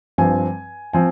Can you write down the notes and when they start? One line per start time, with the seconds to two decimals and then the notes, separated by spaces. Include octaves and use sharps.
0.18 G2 F3 C4 G#5
0.93 F3 C4 G#5